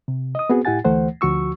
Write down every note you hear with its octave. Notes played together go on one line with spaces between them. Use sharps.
C3
D#5 D#6
B3 C4 F#4 G#4
A2 E4 G4 F#5 G#5 A6
D2 E3 A3 C5 F#5
D2 F3 F#4 C#6 E6